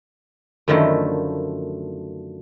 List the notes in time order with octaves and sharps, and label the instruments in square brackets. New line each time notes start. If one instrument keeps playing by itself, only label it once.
[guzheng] F#2 D3 D#3 F3 A3 E4